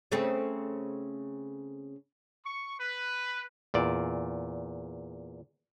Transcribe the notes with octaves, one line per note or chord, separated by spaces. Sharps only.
C#3 A3 C4
C#6
B4
E2 A#2 D5